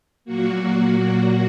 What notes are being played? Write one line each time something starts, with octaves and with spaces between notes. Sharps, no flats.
A#2 F#3 A#3 F#4